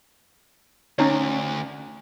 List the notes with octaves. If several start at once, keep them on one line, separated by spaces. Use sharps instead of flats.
D2 C#4 D#4 C#5